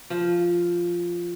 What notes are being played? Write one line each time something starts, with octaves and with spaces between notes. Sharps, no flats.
F3